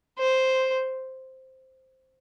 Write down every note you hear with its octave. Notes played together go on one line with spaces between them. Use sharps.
C5